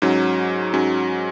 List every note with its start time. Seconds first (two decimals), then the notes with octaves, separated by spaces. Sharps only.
0.02 G#2 F#3 C#4
0.73 G#2 F#3 C#4